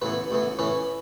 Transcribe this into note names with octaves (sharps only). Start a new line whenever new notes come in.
A1 A2 E3 B3 B4
A1 A2 E3 B3
A2 E3 C#4 B4